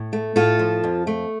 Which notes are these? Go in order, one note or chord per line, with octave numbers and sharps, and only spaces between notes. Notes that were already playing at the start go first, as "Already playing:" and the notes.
Already playing: A2
A3
A2 F4 A4
F3
F2
A3